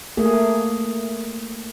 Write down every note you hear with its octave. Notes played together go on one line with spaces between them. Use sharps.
A3 A#3 G#4